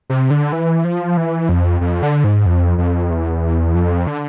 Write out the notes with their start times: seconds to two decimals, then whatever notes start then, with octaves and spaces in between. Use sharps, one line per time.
0.10 C3
0.30 D3
0.52 E3
0.84 F3
1.17 E3
1.49 F2
1.81 F2
2.03 D3
2.24 G#2
2.46 F2
2.78 F2
3.10 E2
3.75 F2
4.07 D3